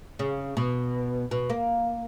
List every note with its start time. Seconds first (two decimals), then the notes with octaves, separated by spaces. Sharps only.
0.19 C#3
0.57 B2
1.31 B2
1.50 A#3